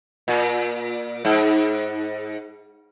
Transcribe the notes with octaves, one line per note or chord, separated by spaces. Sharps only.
A#2
G#2